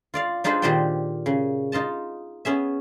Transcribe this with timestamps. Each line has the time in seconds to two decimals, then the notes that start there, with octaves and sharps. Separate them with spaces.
0.14 F4 D5 F5
0.44 D4 D#4 F4 G#4 B4 C5
0.62 A#2 D#3 G4 C5 D5 G5
1.26 C#3
1.72 D#4 F4 D#5 A5
2.45 B3 C#4 G#4 E5